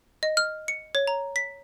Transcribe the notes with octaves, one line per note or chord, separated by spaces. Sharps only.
D#5
F6
C#7
C#5
A#5
B6